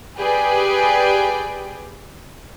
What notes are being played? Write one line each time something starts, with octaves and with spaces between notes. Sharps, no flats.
G4 G#4 B4 D5 G5 G#5